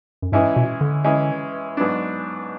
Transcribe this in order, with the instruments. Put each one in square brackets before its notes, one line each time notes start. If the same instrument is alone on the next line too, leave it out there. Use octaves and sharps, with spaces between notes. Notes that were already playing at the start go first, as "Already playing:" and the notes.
[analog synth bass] F#2
[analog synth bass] G#2 [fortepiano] E3 G#3 C#4 E4
[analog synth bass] B2
D3
[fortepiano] E3 G#3 C#4 E4
G#2 F#3 B3 D4